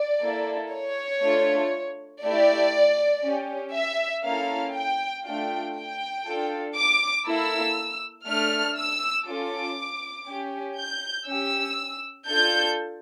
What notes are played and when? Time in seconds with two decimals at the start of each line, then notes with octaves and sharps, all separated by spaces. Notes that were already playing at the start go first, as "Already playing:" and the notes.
Already playing: D5
0.22 A#3 E4 A4
0.73 C#5
1.23 A3 D4 F4
2.23 A3 E4 G4 D5
3.25 C#4 G4
3.74 E5
4.24 A#3 C#4 E4 A4 F5
4.75 G5
5.25 A3 D4 F4 G5
5.76 G5
6.26 D4 F4 A4
6.76 D6
7.26 A#3 E4 A4 E6
8.27 A3 D4 A4 F6
8.77 E6
9.27 C#4 F4 A4 D6
10.28 C#4 G4
10.78 G6
11.28 C#4 G4 E6
12.28 D4 F4 A4 G6